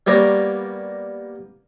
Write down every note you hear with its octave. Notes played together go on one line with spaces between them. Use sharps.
G3 A#3 B3 C#5 A#5